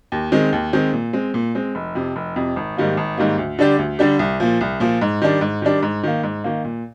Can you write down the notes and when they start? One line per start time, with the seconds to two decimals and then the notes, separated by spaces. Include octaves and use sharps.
0.12 D#2
0.32 D#3 G#3 C4
0.53 D#2
0.73 D#3 G#3 C4
0.93 A#2
1.13 G#3 C4
1.34 A#2
1.55 G#3 C4
1.75 F1
1.95 F2 C3
2.16 F1
2.36 F2 C3
2.56 G#1
2.77 G#2 D#3 G3 A#3
2.97 G#1
3.17 G#2 D#3 G3 A#3
3.38 D2
3.59 D3 G3 D4 G4
3.79 D2
3.99 D3 G3 D4 G4
4.19 C2
4.40 A#2 F3
4.61 C2
4.80 A#2 F3
5.01 G#2
5.22 D#3 G3 D4
5.41 G#2
5.62 D#3 G3 D4
5.83 G#2
6.03 D#3 A#3
6.23 G#2
6.44 D#3 A#3
6.65 A#2